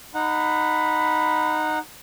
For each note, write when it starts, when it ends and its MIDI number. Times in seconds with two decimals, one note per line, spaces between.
0.14 1.79 63
0.14 1.79 78
0.14 1.78 83